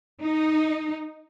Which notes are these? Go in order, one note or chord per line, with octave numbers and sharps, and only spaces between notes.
D#4